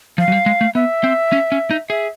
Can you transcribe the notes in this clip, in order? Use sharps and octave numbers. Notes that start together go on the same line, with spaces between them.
F3 F5
F#3
G3
G#3
A3
B3 E5
C4
C#4
C#4
D#4
G#4 E5